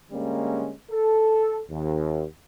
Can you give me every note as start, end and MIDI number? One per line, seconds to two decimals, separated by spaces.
0.11 0.72 50
0.11 0.72 55
0.11 0.72 56
0.11 0.72 58
0.11 0.72 61
0.90 1.60 69
1.70 2.24 39